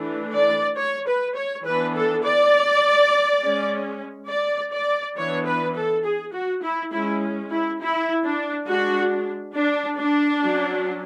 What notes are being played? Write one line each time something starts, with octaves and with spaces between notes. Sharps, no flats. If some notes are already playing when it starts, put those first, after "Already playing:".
Already playing: E3 A3 D4
D5
C#5
B4
C#5
E3 B3 D4 B4
A4
D5
G#3 C#4
D5
D5
E3 B3 D4 C#5
B4
A4
G#4
F#4
E4
G#3 C#4 E4
E4
E4
D4
G#3 D4 F#4
D4
D4
F#3 C#4